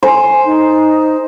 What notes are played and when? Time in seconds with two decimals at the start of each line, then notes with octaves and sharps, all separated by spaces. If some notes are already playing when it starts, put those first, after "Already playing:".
0.03 C5 G#5
0.45 D#4